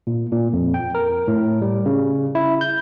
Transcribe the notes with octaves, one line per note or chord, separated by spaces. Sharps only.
A#2
A#2
F2
G5
A#4
A2
G3
C#3
E4
G6